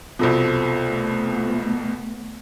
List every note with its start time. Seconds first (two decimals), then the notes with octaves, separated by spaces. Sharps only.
0.19 C2 F2 B2 F4 A4 C5
0.87 A3 B3